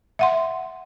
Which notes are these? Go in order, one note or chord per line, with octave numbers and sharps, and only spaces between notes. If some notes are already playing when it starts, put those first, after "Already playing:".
E5 F#5 C6